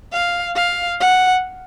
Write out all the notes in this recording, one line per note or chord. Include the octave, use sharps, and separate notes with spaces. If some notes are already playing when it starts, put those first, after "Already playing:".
F5
F5
F#5